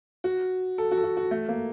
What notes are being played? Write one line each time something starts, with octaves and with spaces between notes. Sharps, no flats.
F#4
A4
F#4
A4
F#4
F#4
A3
A#3